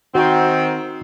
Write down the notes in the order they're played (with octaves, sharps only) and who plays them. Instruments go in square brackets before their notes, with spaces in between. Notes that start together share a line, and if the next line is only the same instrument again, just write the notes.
[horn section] D#3 C4 [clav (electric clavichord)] F#4